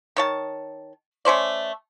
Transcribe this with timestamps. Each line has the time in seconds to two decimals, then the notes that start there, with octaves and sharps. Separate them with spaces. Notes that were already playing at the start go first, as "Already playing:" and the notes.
0.17 D#3 C#5 A5
1.25 A3 C#4 C5 D5